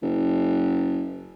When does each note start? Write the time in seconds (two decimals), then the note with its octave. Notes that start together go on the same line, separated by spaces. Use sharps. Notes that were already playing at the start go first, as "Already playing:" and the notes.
0.02 F#1